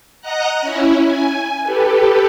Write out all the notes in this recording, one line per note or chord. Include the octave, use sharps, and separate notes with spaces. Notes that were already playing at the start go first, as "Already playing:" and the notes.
D#5 F#5 A#5 F#6
C#4 E4
G#5
G4 A4 B4